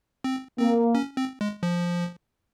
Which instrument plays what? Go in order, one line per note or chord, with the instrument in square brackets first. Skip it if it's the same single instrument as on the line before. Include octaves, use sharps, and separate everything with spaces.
[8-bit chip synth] C4
[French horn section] A#3 [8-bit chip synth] C4
[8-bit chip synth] C#4
C4
G#3
F3